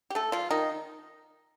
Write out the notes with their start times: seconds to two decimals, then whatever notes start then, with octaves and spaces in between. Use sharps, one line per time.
0.10 G4
0.15 A3 A4
0.32 F3 F4
0.50 D#3 D#4